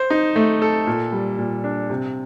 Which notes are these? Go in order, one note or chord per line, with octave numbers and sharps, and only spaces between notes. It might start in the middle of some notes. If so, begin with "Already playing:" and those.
Already playing: C5
D#4
A3
A4
A#2
G3
A#2
D4
C3